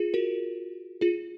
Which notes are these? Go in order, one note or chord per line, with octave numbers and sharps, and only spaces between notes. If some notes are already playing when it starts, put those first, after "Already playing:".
Already playing: F4 G#4
F#4 A#4
F4 G#4